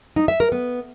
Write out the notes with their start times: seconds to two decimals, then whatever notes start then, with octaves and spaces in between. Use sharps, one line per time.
0.16 D#4
0.28 E5
0.40 A#4
0.52 B3